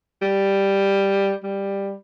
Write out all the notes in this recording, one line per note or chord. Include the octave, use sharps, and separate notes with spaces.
G3
G3